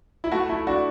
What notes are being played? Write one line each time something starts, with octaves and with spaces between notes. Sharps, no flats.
E4
A3 F#4
A3 E4
D4 F#4